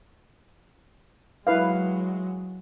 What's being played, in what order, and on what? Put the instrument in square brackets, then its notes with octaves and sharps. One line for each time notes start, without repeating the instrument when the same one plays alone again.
[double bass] F#3 G#3 [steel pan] E4 B4 F5